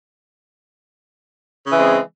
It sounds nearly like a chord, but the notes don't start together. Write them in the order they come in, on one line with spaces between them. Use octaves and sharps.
C#3 E3 G#3 C4